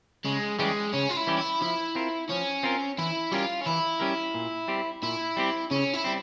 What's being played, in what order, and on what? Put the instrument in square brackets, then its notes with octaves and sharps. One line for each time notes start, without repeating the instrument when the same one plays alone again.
[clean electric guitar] C#3 [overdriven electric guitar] G#3
[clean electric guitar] E3 G3 C#4 G4 [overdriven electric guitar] G#3
[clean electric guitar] C#3 [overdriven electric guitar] C#4
[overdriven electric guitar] F4
E4
[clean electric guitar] E3 G3 C#4 G4
[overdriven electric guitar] E4
[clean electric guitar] F3 [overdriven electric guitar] E4
[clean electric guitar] C4 F4 A#4
[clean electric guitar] F3 [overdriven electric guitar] C#4
[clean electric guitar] C4 F4 A#4
[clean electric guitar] E3 [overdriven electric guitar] E4
[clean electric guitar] G3 C#4 G4 A#4 [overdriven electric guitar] F4
[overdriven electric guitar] C#4
[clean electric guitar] E3 [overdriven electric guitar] E4
[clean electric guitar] G3 C#4 G4 A#4
A#2
G3 C4 G4
[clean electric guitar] A#2 [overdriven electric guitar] E4
[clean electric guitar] G3 C4 G4
[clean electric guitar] C#3 [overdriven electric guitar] C#4
[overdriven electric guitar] E4
[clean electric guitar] G3 C4